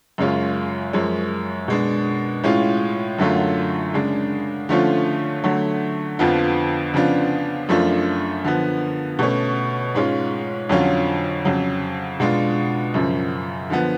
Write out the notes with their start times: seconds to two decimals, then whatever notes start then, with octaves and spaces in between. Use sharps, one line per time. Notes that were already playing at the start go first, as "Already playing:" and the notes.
0.18 F#2 C#3 G#3 C#4 F4
0.93 F#2 F3 G#3 C#4
1.68 B2 G#3 D4
2.44 A2 G#3 C#4 F4
3.18 F#2 D3 F#3 A3 F4
3.94 C#3 G#3 D4
4.69 D3 F3 A3 C#4 F4
5.44 D3 F#3 A3
6.19 F2 D3 F3 B3 F4
6.94 C#3 F3 B3 D4 F4
7.69 F#2 F3 A3 D4 F4
8.44 D3 F3 B3
9.19 B2 A3 C#4
9.95 G#2 G#3 C#4 F4
10.69 F2 D3 F#3 C#4 F4
11.45 F2 C#3 F#3
12.20 B2 G#3 D4 F4
12.94 F#2 C#3 F3
13.70 D3 F3 B3